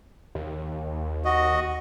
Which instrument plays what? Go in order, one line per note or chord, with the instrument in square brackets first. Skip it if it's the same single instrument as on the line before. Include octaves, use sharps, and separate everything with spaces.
[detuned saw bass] D#2
[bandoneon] F#4 D#5